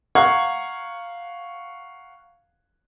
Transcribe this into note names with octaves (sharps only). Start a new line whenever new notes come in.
F5 F#5 A#5 C#6 G#6 C#7